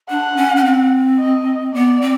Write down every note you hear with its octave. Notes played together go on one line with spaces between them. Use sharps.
D4 F#5
C#4
C#4
C4
D#5
B3 D5
C4